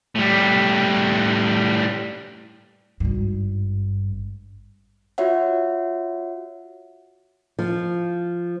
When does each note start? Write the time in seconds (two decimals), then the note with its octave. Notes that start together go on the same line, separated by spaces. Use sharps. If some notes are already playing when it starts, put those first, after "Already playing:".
0.15 A2 G3
3.00 G#1 G2
5.18 F4 F#4 C#5 E5 F#5
7.59 F3